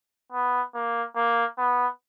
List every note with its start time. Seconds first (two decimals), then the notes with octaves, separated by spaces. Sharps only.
0.32 B3
0.75 A#3
1.16 A#3
1.58 B3